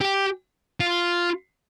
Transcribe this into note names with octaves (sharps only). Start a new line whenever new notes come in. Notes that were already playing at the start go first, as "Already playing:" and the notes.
G4
F4